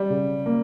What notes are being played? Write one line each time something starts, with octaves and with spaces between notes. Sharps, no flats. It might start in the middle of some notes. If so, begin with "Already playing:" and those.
Already playing: G3
C#3
A#3